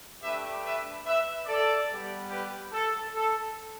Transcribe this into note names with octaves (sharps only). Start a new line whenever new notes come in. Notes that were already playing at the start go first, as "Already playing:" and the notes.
A3 D4 G4 B4 E5
B4 E5
B4 E5
A4 D5
G3 B3 G4
G4 B4
A4
A4